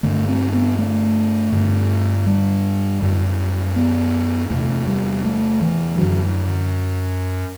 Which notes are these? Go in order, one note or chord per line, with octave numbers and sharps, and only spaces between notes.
G2 D3 A3
C4
B3
A3
G2 D3
G3
F#2 D3
B3
E2 C3 A3
G3
A3
E3
F#2 D3 F#3